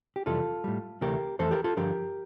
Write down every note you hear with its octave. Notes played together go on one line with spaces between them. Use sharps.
G4
F2 C3 E3 G3 F4 A4
A2 G3
D2 C3 E3 A3 G4 A#4
F2 E3 A3 A4 C5
G4 A#4
F4 A4
G2 D3 F3 G4 A#4